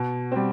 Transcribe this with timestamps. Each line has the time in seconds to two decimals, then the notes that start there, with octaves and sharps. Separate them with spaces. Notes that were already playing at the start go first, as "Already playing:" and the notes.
Already playing: B2
0.32 G3 C4